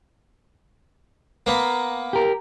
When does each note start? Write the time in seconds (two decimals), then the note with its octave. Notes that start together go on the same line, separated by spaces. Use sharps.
1.46 A#3 B3
2.13 G4 A#4